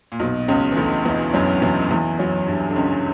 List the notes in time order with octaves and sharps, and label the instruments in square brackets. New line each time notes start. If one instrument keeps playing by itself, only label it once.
[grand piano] A#2
B1 B2
C#2 C#3
E3
D2 D3
E2 E3
F#2 F#3
E2 E3
E2 E3
F#2 F#3
G2
D3
C#2 C#3